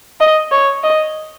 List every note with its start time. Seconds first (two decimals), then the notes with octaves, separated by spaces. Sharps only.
0.20 D#5
0.52 C#5
0.84 D#5